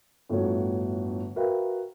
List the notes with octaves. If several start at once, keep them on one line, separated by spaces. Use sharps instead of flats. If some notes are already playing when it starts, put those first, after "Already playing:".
G1 A2 D3 F4 F#4 C#5
F#4 A#4 B4 E5 F5 G5